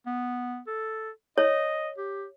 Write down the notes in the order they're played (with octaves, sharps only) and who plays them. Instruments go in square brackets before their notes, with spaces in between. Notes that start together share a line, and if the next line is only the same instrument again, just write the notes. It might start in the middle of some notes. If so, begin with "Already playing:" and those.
[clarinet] B3
A4
[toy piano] C#5 [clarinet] D#5
[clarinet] G4